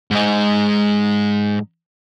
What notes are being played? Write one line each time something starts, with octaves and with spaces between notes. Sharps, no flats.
G#2 D#4